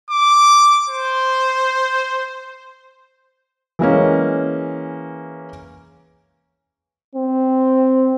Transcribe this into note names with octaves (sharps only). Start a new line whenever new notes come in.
D6
C5
E3 G#3 A#3 C#4
C4